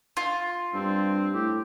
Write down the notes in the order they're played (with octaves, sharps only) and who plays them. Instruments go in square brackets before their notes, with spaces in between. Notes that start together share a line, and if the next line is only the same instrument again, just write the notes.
[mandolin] F4
[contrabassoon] G2 [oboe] C4
[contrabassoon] A2 [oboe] G4